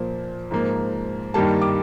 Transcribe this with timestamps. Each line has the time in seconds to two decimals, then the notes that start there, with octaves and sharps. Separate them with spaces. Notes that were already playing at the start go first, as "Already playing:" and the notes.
Already playing: A#2 F3 A#3
0.51 G#2 F3 A#3
1.34 G2 D#3 G3 A#3 A5
1.62 D6